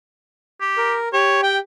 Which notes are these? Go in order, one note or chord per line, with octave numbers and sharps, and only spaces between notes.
G4
A#4
G4 C#5
G5